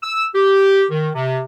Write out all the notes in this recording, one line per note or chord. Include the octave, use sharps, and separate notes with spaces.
E6
G4
D#3
C3